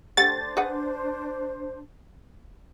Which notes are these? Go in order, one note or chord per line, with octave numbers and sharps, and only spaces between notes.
A3 D4 G4 C5 F#5 A6
G#4 B4 F#5